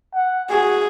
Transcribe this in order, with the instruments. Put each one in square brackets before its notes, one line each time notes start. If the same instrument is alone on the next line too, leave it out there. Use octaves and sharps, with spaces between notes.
[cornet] F#5
[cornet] F#4 [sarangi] G#4